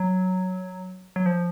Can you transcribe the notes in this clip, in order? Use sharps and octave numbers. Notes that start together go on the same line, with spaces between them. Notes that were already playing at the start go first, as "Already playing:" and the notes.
Already playing: F#3
F#3
F3